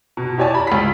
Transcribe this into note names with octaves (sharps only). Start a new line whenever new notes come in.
B2
E4 G4 C#5 D5 G#5 A5
A#5 B5
C#2 B6